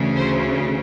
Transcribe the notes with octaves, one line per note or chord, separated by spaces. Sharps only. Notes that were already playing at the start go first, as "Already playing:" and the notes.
Already playing: D2 C#3 E3 A3
C5